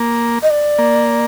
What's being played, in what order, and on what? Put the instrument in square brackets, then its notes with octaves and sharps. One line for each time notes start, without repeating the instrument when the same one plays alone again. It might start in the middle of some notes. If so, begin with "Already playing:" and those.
Already playing: [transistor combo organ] A#3
[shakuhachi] D#5
D5
[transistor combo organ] A#3